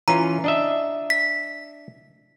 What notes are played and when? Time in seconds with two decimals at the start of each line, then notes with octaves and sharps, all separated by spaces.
0.08 E3 C#4 F4 A#5
0.44 D4 D#5 E5
1.10 B6